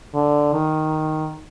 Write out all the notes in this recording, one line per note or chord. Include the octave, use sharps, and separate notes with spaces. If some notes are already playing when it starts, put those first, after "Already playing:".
D3
D#3